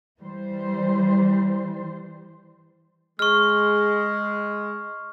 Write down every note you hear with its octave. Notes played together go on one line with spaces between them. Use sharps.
E3 G3 C5
G#3 C#6 F6